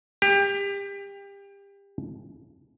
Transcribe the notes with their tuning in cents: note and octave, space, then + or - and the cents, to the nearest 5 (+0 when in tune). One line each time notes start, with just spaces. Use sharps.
G4 +25